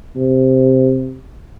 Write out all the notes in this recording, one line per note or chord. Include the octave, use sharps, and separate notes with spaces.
C3